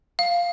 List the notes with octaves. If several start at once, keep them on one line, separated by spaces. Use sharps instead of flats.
F5